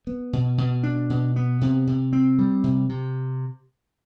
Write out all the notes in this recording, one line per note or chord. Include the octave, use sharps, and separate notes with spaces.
B3
B2
B2
D4
B2
B3
C3
C3
C4
G3
C3
C3